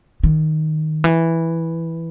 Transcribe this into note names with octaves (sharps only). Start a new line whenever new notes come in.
D#3
E3